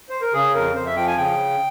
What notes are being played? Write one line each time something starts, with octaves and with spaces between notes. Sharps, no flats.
C5
A#4
C#3 G#4
F2 A#4
F2 C5
E5
F3 G5
G#5
C#3 G5